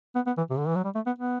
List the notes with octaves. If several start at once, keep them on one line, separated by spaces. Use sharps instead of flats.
B3
B3
E3
C3
D3
E3
F#3
G3
A3
B3
B3